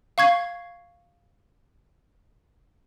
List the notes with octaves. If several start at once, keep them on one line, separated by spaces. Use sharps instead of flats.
F5 C#6 G#6 C7